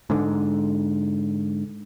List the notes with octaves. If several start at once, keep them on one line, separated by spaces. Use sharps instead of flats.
G#2 D3